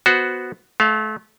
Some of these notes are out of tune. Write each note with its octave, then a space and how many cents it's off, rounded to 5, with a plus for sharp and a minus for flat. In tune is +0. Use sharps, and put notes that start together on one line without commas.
B3 +0 F#4 +0 C5 +0
A3 -30 F5 +10